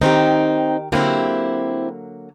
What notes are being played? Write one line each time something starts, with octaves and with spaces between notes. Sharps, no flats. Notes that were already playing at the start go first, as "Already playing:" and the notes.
D#3 C4 D#4 G4
D3 F#3 A#3 C4 E4 G4